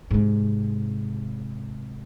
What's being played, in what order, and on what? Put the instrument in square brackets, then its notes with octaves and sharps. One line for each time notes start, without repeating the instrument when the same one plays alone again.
[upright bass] G#2 C3